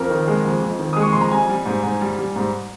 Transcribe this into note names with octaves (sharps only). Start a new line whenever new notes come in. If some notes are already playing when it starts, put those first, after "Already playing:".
Already playing: F2 A#4
D#3
G#3
F2
F2
D#3
G#3 D#6
C#6
F2 C6
A#5
G3 G#5
G3
G#2
G#2
G3
G3
G#2